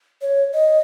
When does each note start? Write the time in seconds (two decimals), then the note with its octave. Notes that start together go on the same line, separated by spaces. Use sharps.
0.22 C#5
0.53 D#5